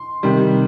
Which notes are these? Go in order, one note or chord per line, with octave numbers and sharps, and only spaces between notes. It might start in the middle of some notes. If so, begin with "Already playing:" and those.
Already playing: C6
C3 D#3 G3